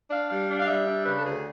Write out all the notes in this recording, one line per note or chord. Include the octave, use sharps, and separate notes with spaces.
D4 F5
G3 F5
D4
F5
G3 E5
D4
C#3 B4
A4
D2 G#4